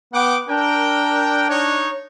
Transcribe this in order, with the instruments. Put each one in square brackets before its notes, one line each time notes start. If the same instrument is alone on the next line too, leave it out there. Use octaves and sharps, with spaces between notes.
[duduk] B3 [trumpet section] F#5 G5 D6
[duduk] D4 [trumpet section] A#4 G5
[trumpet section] D#4 C#5